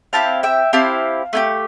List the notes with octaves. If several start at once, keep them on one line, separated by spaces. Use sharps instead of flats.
C4 E4 G4 F5 A5
E5 G5
C4 E4 G4 F5 A5
A3 E4 G4